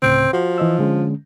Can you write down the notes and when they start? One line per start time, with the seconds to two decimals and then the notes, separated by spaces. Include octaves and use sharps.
0.02 D2 A2 C#3 C4
0.33 F3 F#4
0.58 E3 D#5 E6
0.79 D3 G#3 C#4